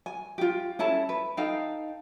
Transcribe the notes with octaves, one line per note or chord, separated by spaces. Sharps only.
G#5
F4 G4
C#4 E4 A4 A5
B4
D#4 A4 F5 G5